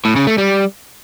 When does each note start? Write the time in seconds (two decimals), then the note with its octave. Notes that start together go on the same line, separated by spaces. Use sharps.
0.05 A2
0.16 C#3
0.27 A3
0.38 G3